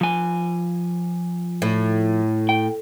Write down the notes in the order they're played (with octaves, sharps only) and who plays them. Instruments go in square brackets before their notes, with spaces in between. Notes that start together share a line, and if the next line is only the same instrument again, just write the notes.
[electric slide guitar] F3 G#5
[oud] A2
[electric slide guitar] G5